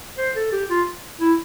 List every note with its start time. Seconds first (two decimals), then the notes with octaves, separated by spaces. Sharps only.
0.18 C5
0.36 A4
0.52 G4
0.70 F4
1.21 E4